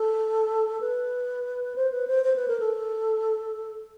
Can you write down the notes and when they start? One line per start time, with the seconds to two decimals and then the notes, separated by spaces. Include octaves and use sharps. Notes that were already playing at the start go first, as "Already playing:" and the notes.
Already playing: A4
0.81 B4
1.76 C5
1.92 B4
2.08 C5
2.24 C5
2.36 B4
2.48 A#4
2.60 A4